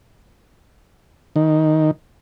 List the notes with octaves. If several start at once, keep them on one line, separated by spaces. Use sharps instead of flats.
D#3